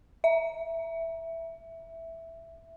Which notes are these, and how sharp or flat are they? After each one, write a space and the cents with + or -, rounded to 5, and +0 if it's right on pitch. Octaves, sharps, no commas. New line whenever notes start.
E5 +0